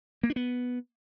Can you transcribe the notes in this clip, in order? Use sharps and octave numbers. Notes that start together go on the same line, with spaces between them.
A#3
D4
B3